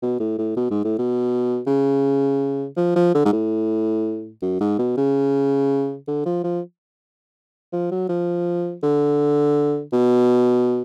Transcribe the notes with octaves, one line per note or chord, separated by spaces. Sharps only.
B2
A2
A2
B2
G#2
A2
B2
C#3
F3
F3
D3
G#2
A2
F#2
G#2
B2
C#3
D3
F3
F3
F3
F#3
F3
D3
B2